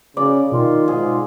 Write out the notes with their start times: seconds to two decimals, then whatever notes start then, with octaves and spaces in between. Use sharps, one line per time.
0.17 C#3 D5
0.52 B2 D#3 F4
0.88 G#2 G#4